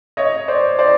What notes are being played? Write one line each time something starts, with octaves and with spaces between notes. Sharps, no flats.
C#5 D#5
C5 D5
C5 D5